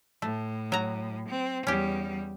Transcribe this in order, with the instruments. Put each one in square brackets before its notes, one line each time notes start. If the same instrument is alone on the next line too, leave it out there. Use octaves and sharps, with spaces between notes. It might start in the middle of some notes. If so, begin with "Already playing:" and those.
[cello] A2 [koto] A3
[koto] F#3 A#5
[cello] C4
[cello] E2 G3 [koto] C#4 G4